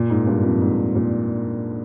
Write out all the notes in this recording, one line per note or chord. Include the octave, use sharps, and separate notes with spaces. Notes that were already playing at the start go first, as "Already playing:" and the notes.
Already playing: A#2
G#2
G2
F2
G#2
A#2